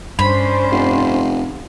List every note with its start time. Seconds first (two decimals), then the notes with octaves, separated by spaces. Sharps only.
0.19 G2 C#4 D4 C5 B5
0.71 F1